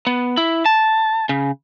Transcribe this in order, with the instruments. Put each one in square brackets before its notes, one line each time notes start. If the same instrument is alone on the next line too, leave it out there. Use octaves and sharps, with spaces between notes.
[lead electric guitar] B3
E4
A5
C#3